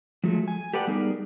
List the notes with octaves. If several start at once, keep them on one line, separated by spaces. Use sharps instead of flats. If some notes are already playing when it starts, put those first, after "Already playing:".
F3 F#3 G#3 A3
G#5
G4 A4 B4 D5 F#5 G5
G3 B3 D#4 G#4 A#4 D5